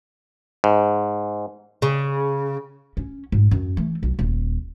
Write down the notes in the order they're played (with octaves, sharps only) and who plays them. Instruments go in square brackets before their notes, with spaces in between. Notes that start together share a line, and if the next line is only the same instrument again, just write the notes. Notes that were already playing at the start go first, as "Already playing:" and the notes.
[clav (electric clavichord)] G#2
[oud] C#3
[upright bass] C#4
G#2
F#2
E3 A3
B1
D#1